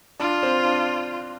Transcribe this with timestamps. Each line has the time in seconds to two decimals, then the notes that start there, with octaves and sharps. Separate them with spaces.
0.20 D4 F4
0.43 C4
0.65 D4